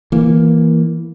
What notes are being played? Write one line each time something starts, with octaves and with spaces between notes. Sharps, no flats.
E3 A#3